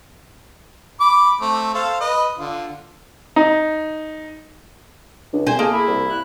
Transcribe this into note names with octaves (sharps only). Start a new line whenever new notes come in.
B5 D6
A3 C4
A4 C5 F5
B4 D#5
D3 F4
D#4
C#2 D4
C2 B2 C5 G#5
A#3 G#4 A4
E4
C2
F#6